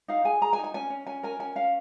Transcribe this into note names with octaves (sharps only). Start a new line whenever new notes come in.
D#4 F5
G#4 G#5
G#4 A#5
G#5
D#4
G#5
C#4 G#5
C#4
C#4 G#5
A#4 G#5
C#4 G#5
C#4 F5